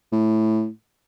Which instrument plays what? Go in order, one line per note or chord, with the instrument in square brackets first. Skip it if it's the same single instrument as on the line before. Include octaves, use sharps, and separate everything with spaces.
[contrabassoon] A2